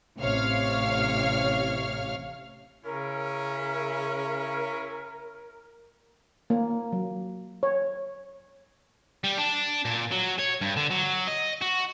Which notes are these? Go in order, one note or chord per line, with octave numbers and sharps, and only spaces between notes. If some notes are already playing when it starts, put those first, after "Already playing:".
A1 C3 C#5 F5 F6
C#3 C#4 E4 A#4
A#3
F#3
C#5
G3
D4
A#2
F#3
C#5
G2
D3
F#3
D#5
F#4